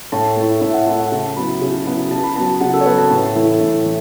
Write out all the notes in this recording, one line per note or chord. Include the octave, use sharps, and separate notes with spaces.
A2 A5
A3 E4
A2 E5
F#5
A3 E4 A5
F#5
C#3 A5
F#3 B3 E4 B5
C#3
F#3 B3 E4
C#3 A5
B5
F#3 B3 A5
C#3 F#5
A4
C#5
F#3 B3 B4
A5
A2
E3 A3 E4
A2
E3